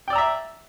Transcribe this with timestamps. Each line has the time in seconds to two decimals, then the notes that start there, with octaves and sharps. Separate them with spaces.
0.08 G5
0.10 D5
0.13 E6
0.15 A#5
0.18 E5